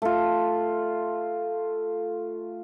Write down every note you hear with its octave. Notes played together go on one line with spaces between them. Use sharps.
A3 F4